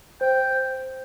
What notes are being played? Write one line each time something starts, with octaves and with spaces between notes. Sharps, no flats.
C5 G5